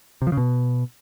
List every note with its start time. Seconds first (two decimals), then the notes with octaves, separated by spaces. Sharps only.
0.22 C3
0.27 F3
0.32 C#3
0.37 B2